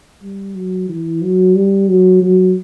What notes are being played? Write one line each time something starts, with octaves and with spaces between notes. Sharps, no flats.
G3
F#3
E3
F#3
G3
F#3
F#3